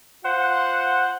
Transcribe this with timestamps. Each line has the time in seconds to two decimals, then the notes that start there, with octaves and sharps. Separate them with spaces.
0.24 F4 C5 F#5